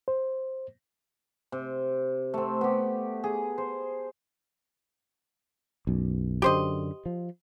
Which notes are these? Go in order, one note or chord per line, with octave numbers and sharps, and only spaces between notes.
C5
C3
A3 C4
B3 G4
G#4
C5
B1 F#2
F#2 D3 G4 C5 D#5
F3